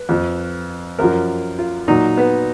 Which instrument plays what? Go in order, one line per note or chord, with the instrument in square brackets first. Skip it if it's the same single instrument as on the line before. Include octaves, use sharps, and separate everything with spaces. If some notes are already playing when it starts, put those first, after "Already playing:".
Already playing: [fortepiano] B4
F2 F3
F#2 F3 A#4
F4
A#2 F#3 D#4
B3